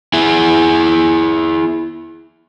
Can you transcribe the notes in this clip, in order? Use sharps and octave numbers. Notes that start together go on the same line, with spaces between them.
E4 G#4